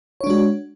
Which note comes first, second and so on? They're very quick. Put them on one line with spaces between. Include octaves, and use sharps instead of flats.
C#5 D4 G#3 F#4